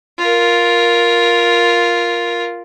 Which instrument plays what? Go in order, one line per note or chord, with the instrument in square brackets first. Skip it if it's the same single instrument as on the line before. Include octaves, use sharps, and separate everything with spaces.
[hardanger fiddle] F4 A#4